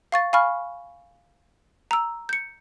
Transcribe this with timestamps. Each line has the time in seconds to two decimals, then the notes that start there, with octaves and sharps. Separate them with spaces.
0.12 F5 C#6 A6
0.33 F5 G#5 B5 C#6 F6
1.91 A#5 E6
2.29 G6 C#7